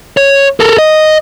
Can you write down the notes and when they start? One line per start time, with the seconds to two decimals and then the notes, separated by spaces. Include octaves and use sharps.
0.17 C#5
0.60 A4 A#4
0.78 D#5